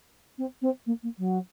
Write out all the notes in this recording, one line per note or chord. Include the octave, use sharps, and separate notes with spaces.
C4
C4
A#3
A#3
F#3